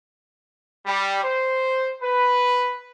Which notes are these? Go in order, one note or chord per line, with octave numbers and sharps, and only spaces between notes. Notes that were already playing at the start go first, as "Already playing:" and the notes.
G3
C5
B4